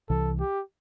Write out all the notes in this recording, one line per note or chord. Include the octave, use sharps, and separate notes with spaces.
C2 C3 E3 A4
G4